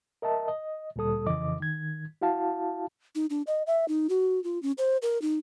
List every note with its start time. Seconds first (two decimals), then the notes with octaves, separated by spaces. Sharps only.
0.22 A#4 D#5 E5 A5
0.48 D#5
0.96 D2 A#2 G3 A4 D#6
1.27 F2 C#3 E3 D#5 D6
1.60 D#3 G#6
2.21 E4 F#4 F5 A5
3.15 D#4
3.30 D4
3.47 D#5
3.67 E5
3.88 D#4
4.09 F#4
4.44 F4
4.63 C#4
4.78 C5
5.02 A#4
5.22 D#4